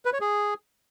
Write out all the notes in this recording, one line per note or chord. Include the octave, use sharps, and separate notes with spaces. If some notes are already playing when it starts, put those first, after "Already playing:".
B4
C#5
G#4